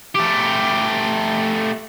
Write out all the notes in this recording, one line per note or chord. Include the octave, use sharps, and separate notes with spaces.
A3 G4